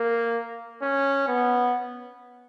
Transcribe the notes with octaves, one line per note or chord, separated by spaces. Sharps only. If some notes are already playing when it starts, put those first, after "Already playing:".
Already playing: A#3
C#4
B3